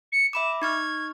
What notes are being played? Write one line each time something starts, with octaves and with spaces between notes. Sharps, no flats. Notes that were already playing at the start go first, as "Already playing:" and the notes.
C#7
E5 B5 D6 E7
D#4 C#6 F6 G#6